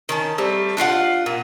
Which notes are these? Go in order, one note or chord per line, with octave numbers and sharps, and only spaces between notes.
D#3 C#4 A5
G3 A3 C4
D4 F4 F5 F#5
A#2